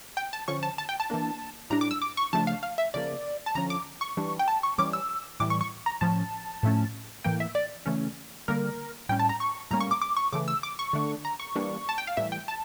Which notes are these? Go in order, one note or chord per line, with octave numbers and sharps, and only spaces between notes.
G5
A5
D3 F3 C#4 C#6
A5
A5
G5
A5
E3 A#3 D4
A2 G3 D4 A#5
D6
E6
D6
C#6
C#3 F3 A3 D4 A5
F5
F5
E5
C#3 F3 A#3 D5
A5
D3 F3 C#4 A#5
D6
C#6
E3 G3 D4
G5
A5
C#6
E3 G3 C#4 D6
E6
A2 E3 G3 D6
C#6
C#6
A#5
A2 F3 C#4 A5
A2 F3 A3 C#4
A2 E3 A#3 G5
E5
D5
C#3 E3 A3 C#4
D3 G3 A#3 A#4
A2 G3 C#4 G5
A5
A#5
C#6
A2 G3 A#3 C#4 A#5
C#6
D6
D6
C#6
C#3 E3 A3 D6
E6
D6
C#6
D3 A3 D4
A#5
C#6
E3 G3 A#3 D4
A5
G5
F5
A2 E3 G3 E5
G5
A5